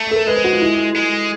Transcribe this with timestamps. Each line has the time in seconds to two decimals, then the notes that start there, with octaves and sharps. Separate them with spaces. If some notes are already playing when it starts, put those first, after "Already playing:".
Already playing: A3
0.11 A4
0.16 A#4
0.27 G#3 B4
0.36 C5
0.44 F#4
0.53 F4
0.61 E4
0.96 G#3